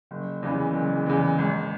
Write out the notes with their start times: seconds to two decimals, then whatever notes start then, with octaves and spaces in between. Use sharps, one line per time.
0.11 F#1
0.43 E2 C#3 E3
0.74 F#1
1.06 E2 C#3 E3
1.38 G#1